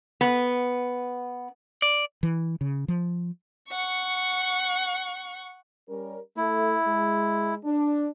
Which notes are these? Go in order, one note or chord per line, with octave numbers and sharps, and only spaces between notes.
B3
D5
E3
C#3
F3
F#5 C#6
G3 C#4 A#4
A3 E4
G#3
D4